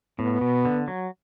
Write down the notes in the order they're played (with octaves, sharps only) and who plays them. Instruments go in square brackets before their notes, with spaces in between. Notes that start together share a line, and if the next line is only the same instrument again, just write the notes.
[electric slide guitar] A2 [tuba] B3
[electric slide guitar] B2
D3
F#3